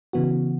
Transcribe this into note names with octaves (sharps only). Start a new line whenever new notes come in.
C#3 E3 B3 F#4